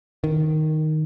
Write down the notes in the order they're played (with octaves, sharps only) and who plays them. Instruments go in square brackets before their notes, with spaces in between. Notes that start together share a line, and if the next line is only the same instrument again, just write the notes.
[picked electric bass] D#3